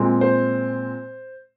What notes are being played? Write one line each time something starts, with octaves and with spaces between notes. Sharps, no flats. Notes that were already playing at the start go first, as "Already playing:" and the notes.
Already playing: A#2 G#3 C4
C5